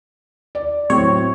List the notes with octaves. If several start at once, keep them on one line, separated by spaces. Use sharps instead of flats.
D5
A2 F#3 C4 C#5